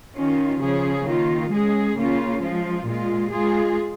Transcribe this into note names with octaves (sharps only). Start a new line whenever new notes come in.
D#3 C#4 F4
C#3 F3 C#4 G#4
D#3 A#3 F4
G#3 C#4 G#4
C#3 A#3 C#4 F4
F3 G#3 F4
A#2 G#3 F4
G#3 F4 G#4